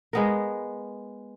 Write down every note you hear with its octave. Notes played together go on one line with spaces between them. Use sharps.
G#3 B3 A#4